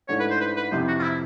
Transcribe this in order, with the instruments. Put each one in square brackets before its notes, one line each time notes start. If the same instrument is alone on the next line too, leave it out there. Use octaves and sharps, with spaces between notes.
[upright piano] G#2 E3 A3 D4 [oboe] C#5
[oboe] B4
C5
B4
B4
[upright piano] F2 C3 E3 [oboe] C5
[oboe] F#4
F4
E4